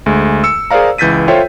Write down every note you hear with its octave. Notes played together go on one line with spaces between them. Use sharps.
D2 G#3
E6 C#7
G#4 A#4 C5 D5 F5 A#5
C#2 E3 G6 A6 B6 D#7
F4 A4 C5 C#5 E5 G5